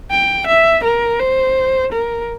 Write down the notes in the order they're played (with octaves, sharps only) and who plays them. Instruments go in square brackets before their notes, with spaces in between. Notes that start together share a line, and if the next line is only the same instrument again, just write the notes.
[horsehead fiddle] G5
E5
A#4
C5
A#4